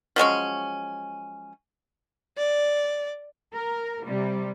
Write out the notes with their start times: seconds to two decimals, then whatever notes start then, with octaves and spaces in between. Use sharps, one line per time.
0.16 F3 F#3 G#3 C#4
2.37 D5
3.55 A#4
4.06 C3 G3